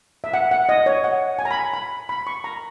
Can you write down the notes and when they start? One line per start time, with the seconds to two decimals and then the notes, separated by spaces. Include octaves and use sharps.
0.24 E5
0.34 F#5
0.51 F#5
0.69 D#5
0.86 C#5
1.04 F#5
1.39 G#5
1.45 A#5
1.51 B5
1.74 B5
2.09 B5
2.27 C#6
2.44 A#5